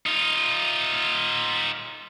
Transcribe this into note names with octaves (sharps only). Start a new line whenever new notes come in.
D#4 F4